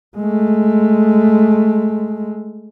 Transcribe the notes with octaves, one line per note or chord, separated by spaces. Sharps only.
G#3 A3